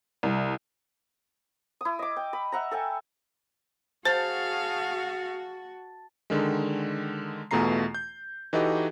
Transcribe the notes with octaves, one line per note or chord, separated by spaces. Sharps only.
C2
E4 D#6
D#5 D6
G5
D#5 B5
E5 F#5 A#5
A4 G5 G#5
F#4 G#4 C5 F5 A5
D3 D#3 G#3
E2 B2 A3 F4 A#5 C7
G6
E3 D#4 F#4 G4 A4 D#5